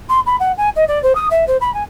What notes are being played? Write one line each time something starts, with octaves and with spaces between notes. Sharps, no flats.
C6
B5
F#5
G#5
D#5
D5
C5
D#6
E5
C5
B5
G#5